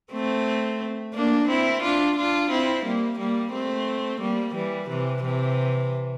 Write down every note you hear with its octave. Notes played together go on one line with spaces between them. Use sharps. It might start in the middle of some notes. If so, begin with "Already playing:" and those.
A3 C4
A#3 D4
C4 E4
D4 F4
D4 F4
C4 E4
G3 A#3
G3 A#3
A3 C4
G3 A#3
E3 G3
C3 E3
C3 E3